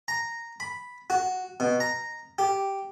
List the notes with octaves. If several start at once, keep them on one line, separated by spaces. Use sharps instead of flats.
A#5
B5
F#4
B2
A#5
G4